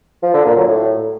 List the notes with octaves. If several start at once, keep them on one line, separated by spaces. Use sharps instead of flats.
F3
D3
A#2
F#3
A2